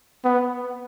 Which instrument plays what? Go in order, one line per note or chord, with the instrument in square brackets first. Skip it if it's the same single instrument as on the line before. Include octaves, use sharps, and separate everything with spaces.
[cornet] B3